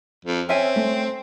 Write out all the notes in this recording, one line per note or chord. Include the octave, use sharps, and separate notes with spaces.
F2
C4 C#4 E5 G#5
A3